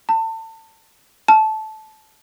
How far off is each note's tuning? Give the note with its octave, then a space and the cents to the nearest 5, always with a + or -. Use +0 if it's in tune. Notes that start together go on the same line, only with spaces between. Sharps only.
A5 +30
A5 -15